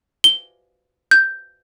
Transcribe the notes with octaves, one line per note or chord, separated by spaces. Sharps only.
G7
G6